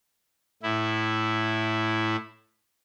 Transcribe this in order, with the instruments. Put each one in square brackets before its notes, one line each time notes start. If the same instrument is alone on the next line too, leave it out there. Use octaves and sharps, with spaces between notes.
[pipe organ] A2 E4